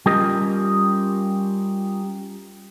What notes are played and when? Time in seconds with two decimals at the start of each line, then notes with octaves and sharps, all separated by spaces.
0.06 G3 C#4 F4 G4 A#4 D#5